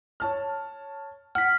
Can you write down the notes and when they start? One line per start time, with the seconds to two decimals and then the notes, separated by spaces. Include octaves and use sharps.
0.20 C#5 A5 F6
1.35 F#5 F6 B6